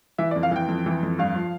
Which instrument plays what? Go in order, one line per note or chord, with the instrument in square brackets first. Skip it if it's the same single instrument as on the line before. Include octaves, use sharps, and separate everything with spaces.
[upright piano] E3 E5
D5
F2
F5
E3 G5
F2
E3
F2
G2 F5
F3